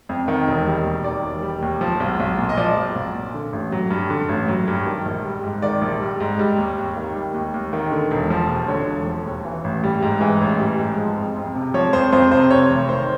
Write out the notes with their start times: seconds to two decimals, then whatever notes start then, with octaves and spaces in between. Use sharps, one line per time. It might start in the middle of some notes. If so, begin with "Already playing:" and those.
0.09 F2
0.28 D#3
0.48 E1
0.66 G3
0.86 D#2
1.04 D#3 D5
1.24 E1
1.42 G3
1.62 D#2
1.81 F3
2.00 B1
2.20 B1
2.38 A#2
2.49 D#5
2.57 F3 D5
2.76 B1
2.96 B1
3.15 A#2
3.34 D3
3.53 A1
3.72 F#3
3.90 G2
4.10 D3
4.29 A1
4.48 F#3
4.68 G2
4.86 D#3
5.05 A#1
5.25 G3
5.44 G#2
5.62 D#3 D5
5.81 A#1
6.01 G3
6.20 G#2
6.39 G3
6.58 D#2
6.78 D#2
6.96 D#3
7.15 G3
7.34 D#2
7.54 D#2
7.73 D#3
7.92 D3
8.11 E1
8.30 F3
8.49 D#2
8.68 D3 C#5
8.88 E1
9.07 F3
9.26 D#2
9.45 E3
9.64 A1
9.84 G3
10.02 G#2
10.21 E3
10.41 A1
10.59 G3
10.79 G#2
10.98 F3
11.17 F2
11.36 F2
11.55 C3
11.74 F3 C#5
11.93 F2 C5
12.12 F2 C5
12.31 C3 C5
12.51 C3 C#5
12.70 F1
12.89 D#3 C5